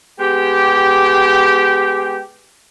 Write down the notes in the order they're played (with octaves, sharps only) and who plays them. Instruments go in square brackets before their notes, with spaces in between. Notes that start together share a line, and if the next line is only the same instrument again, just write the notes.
[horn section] G#3 B3 G4